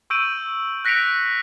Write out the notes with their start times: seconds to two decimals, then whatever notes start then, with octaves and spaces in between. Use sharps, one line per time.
0.10 C#6 E6 G6 D7 D#7 F#7
0.85 F#6 A#6 B6 C#7 D7 F7